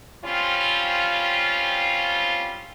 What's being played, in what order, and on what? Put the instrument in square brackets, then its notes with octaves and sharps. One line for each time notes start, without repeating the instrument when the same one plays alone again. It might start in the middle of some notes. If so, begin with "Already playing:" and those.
[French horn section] G3 C4 C#4 F4